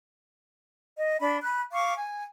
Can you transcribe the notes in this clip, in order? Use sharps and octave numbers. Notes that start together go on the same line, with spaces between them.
D#5
D4 B5
B5 F#6
F5 C#6 D6
G#5